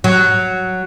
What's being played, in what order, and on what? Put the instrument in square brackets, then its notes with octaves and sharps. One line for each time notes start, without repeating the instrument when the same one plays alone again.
[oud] F#3